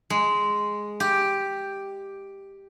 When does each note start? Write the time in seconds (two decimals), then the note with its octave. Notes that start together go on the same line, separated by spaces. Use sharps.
0.10 G#3
1.00 G4